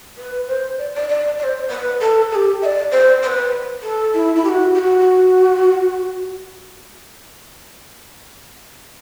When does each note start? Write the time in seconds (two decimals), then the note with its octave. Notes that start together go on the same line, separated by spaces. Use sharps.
0.18 B4
0.48 C5
0.78 D5
0.95 D5
1.09 D5
1.39 D5
1.44 C5
1.70 B4
2.00 A4
2.31 A4
2.35 G4
2.62 E5
2.65 D5
2.92 C5
3.22 C5
3.27 B4
3.83 A4
4.14 E4
4.35 E4
4.45 G4
4.49 F#4
4.75 G4
4.79 F#4